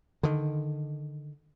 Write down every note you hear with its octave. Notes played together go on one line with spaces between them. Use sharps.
D3 D#3